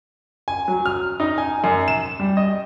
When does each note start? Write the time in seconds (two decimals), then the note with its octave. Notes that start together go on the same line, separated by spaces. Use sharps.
0.48 G#5
0.68 F#3
0.86 F6
1.20 D#4
1.38 G#5
1.64 F#2
1.88 E7
2.20 G3
2.37 D#5